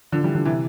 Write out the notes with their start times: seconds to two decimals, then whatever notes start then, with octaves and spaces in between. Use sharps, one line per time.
0.12 D3 F3
0.23 E3 G3
0.34 D3 F3
0.45 C3 E3